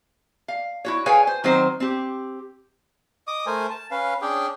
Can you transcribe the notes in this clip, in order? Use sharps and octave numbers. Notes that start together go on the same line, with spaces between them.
F5
E4 F#4 C#5
G#4 B4 C#5 F5 G5 G#5
C5
D#3 F#3 C4 C5
C4 G4
D#5 D6 D#6
A3 A#4 C5 G#5
A5
C#4 B4 F5
C#4 D4 G#4 G5